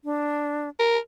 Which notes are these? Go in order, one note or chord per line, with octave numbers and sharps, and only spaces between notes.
D4
A#4